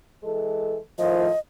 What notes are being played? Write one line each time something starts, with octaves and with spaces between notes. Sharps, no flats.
E3 G#3 A4
A2 D#3 F3 D#5